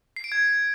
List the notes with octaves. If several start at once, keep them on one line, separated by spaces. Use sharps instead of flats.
C7
D7
G#6